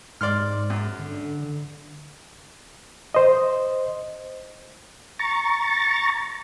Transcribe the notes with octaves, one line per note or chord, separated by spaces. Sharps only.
G#2 D5 C6 F6
F#2
D3
C5 D#5
A#5 C#6 A6